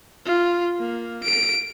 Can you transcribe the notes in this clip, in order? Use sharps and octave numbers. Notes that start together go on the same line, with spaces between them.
F4
A#3
D7